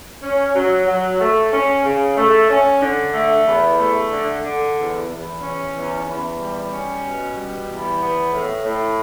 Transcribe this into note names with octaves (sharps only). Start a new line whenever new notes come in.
C#4
F#3
F#3
A3
C#4
C#3
A3
C#4
D3
A3
E2
A3
D3
D3
E2
E2
C#4
E2
E2
G3
C#4
B2
G3
E2
B3
A2
A2